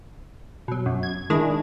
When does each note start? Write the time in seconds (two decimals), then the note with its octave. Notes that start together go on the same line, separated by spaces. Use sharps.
0.68 B2 F#3
0.86 F#2
1.03 G#6
1.30 D#3 G#3 D4 E4 G#4